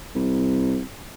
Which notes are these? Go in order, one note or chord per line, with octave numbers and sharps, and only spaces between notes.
C2